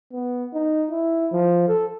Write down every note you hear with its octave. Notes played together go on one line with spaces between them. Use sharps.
B3
D#4
E4
F3
A4